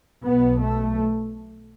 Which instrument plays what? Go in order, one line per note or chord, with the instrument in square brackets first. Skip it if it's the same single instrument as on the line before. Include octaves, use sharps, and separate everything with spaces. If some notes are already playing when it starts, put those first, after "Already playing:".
[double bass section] B1 B2 B3
A3